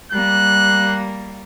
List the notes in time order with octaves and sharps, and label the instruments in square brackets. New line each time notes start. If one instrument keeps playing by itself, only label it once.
[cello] G3 A#3 [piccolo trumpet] F#6